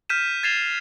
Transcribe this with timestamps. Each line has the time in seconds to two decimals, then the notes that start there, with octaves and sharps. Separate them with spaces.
0.09 F6 G6 B6 D#7 E7
0.43 G#6 A6 C7 E7 F7 G7